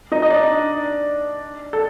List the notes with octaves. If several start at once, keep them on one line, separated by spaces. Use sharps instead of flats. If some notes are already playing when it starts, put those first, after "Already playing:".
D#4 D#5
D#5
D4 D5
A4